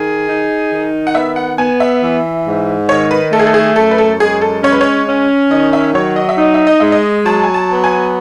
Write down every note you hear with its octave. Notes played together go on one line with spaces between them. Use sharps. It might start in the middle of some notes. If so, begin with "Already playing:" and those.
Already playing: D#3 G#4
D#4
D#3
F#5
B3 E5
F#5
B3 G#5
E5
E3
G#2
D#3 C#5
B4
A3 A4
G#4
A4
G#4
F#2 A4
B4
A4
G#3 G#4
A4
C#4 C#5
B4
C#5
C#4
D#3 D#5
E5
F#3 C#5
D#5
E5
D#4 D#5
E5
D#5
G#3 E5
D#5
F#3 A5
G#5
A5
B3
G#5